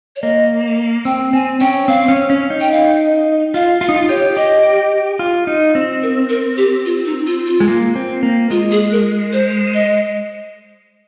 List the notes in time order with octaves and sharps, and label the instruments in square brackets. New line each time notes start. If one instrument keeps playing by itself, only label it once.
[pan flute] C#5
[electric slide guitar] A#3 [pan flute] D#5
[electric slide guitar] C4 [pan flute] G5
[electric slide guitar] C4 [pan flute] G#5
[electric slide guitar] C#4 [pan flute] G5
[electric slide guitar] C4 [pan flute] F5
[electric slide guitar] C#4
C#4
D#4
[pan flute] G5
F5
[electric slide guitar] F4 [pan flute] F5
[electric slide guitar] F4 [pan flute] F5
[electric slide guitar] D#4
F4
[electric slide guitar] G4 [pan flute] C#5
[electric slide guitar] G4 [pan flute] D#5
[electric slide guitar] F4
D#4
C4
[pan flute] A#4
A#4
G4
F4
D#4
F4
F4
[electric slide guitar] G#3
A#3
C4
A#3
[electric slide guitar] G#3 [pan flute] F4
[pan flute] G#4
A#4
C5
D#5